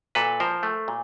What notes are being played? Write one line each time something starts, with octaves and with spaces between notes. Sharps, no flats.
A#2 A4 B4
F3 A#4 C5
A3
A#2